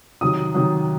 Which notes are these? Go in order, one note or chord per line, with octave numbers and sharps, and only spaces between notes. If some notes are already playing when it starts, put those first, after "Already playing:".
C3 D#3 F#3 D#6
C3 D#3 F#3